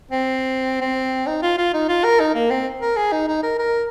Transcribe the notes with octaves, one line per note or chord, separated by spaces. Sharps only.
C4
C4
D#4
F4
F4
D#4
F4
A#4
D#4
A#3
C4
A#4
G#4
D#4
D#4
A#4
A#4